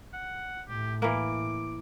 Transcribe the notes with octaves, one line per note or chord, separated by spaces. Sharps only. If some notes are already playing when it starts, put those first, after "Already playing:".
F#5
A2 G4
E3 A#3 D6